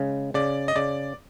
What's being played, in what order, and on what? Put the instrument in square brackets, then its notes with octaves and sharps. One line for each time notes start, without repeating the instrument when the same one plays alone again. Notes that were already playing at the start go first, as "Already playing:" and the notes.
Already playing: [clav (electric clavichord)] C#3 G#3
[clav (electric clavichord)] C#3 [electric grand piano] D5
[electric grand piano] D#5
[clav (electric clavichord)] C#3 [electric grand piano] D5